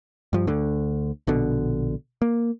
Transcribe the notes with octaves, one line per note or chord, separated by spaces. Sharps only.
G2 F3
D2 D3
A#1 B2 D3
A#3